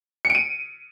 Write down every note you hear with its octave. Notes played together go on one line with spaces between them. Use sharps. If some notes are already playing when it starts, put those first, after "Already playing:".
C#7
D7
D#7